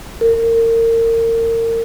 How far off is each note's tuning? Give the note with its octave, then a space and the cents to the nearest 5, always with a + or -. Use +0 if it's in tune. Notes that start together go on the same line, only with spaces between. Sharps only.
A#4 -30